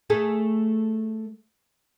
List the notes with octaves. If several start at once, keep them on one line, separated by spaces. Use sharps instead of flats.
A3 G#4 A4